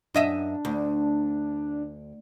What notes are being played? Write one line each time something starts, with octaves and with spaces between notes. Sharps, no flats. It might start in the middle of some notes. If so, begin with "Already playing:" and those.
F#2 D4 D#5 E5
D2